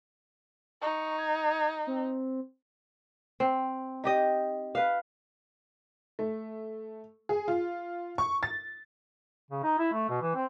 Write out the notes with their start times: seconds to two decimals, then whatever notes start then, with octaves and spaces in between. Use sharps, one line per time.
0.82 D#4 C#6
1.19 G#6
1.87 C4
3.40 C4
4.04 D#4 G4 D#5
4.75 B4 F5
6.19 A3
7.29 G#4
7.48 F4
8.18 C#6
8.43 A6
9.51 C#3
9.64 D#4
9.79 E4
9.93 A3
10.09 B2
10.22 E3
10.35 C4